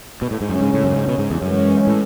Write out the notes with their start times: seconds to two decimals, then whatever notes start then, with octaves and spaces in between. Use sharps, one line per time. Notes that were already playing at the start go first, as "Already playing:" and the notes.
0.22 B2
0.31 A2
0.41 G#2
0.49 F#2 C#3 G#3 C#4
0.61 G#2
0.74 A2
0.84 F#2
0.92 A2
0.96 G#2
1.08 B2
1.18 G#2
1.30 E2
1.41 F#2 E3 G#3 C#4
1.87 A2